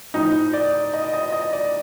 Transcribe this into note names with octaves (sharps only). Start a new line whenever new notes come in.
A2 F3 D#4
D5
D#5
D#5
D#5
D5